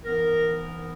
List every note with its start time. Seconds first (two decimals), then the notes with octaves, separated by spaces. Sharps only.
0.05 G#2 E3 B3 A#4